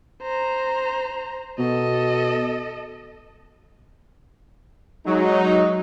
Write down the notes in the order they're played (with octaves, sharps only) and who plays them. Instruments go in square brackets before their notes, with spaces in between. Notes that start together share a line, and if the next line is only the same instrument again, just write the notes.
[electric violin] C5 A#5
[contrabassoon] B2 [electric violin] A4 D#5
[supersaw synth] F#3 [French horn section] G#3 D#4